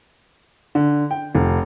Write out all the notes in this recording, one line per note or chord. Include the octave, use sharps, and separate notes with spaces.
D3
G5
F1